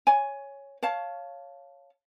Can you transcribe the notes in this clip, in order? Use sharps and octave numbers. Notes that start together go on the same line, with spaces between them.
C#5 G#5
C#5 F5 A5